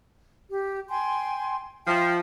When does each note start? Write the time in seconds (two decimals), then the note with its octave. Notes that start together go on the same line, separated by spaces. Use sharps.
0.50 G4
0.89 G5 G#5 C6
1.87 F3 E5 G5